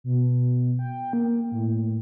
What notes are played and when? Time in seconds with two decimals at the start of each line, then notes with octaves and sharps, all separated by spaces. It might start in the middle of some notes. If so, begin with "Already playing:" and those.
0.04 B2
0.79 G5
1.13 A#3
1.52 A2